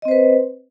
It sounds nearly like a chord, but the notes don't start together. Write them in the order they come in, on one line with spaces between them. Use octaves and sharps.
D#5 C4 C5 B4